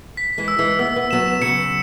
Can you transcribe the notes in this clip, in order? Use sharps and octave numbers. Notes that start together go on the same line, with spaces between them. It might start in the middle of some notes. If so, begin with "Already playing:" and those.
B6
E3 G#3
E6
E3 G#3
B3 E6
B3
F#3 B3 E7
C#3 F#3 C#7